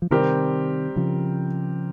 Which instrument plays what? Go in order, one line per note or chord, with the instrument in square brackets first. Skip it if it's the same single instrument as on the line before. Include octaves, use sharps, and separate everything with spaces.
[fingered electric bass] F3
[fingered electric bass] C3 D#3 [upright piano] G3 C4 G4 A#4
[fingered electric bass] C#3 F3